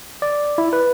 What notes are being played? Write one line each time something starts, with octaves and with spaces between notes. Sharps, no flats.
D5
E4
B4